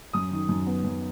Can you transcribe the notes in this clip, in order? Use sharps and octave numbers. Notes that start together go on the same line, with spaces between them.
F#2 D#6
D#3
F#2
B3
F#2